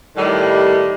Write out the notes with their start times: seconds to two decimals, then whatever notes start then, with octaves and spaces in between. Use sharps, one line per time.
0.16 A2 D#3 G3